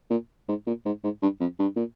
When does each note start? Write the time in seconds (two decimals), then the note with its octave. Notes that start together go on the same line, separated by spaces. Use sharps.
0.11 A#2
0.49 G#2
0.67 A#2
0.86 G#2
1.04 G#2
1.22 G2
1.41 F2
1.59 G2
1.76 A#2